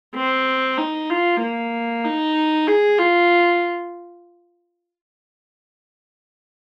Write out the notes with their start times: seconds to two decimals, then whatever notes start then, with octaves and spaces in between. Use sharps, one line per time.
0.15 C4
0.78 D#4
1.10 F4
1.41 A#3
2.04 D#4
2.67 G#4
2.99 F4